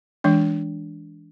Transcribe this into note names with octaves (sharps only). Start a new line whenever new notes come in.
E3 G#3 D4